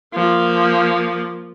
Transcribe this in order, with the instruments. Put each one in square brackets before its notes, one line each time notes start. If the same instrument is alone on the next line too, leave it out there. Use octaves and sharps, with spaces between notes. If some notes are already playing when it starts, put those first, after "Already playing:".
[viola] F3 A#3